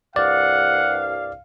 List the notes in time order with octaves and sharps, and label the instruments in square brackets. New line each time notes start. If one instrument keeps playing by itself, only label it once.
[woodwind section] C2 G2 F5 [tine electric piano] D5 [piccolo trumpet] F#5